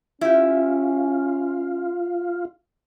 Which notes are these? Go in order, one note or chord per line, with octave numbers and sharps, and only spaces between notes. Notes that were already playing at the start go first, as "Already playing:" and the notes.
C#4 E4 F4 G4